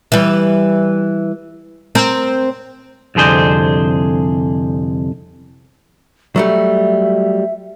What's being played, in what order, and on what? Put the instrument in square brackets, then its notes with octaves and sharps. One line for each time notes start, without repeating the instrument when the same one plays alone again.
[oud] E3 G3
C4 A#4
[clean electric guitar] C2 F2 D3 G#4 C5
[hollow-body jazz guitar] F#3 G3 A3 [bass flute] E5